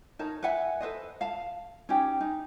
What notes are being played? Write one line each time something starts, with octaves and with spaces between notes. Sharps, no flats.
D#4 A#4 C#5 A5
B4 E5 F#5 G#5
A4 B4 C5 D#5
F5 A5
C#4 D#4 G4
D#4